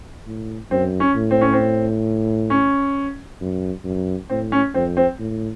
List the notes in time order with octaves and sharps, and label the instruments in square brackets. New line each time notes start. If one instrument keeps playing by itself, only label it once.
[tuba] A2
[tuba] F#2 [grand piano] C4
[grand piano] C#4
[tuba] A2
[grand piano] C4
C#4
C4
C#4
[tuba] F#2
F#2
[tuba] A2 [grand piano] C4
[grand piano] C#4
[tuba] F2 [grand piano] C4
[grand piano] C4
[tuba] A2